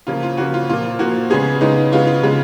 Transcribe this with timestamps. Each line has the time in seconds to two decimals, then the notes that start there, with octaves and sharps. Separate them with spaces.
0.07 C#3 F3 A#3 F4
0.23 F4
0.37 C#3 F3 A#3 F#4
0.54 F4
0.69 A#2 F3 A#3 F4
0.99 A#2 F3 A#3 F#4
1.30 C#3 G#3 B3 G#4
1.61 C#3 G#3 B3 D#4
1.92 C#3 G#3 B3 F4
2.07 F4
2.23 C#3 G#3 B3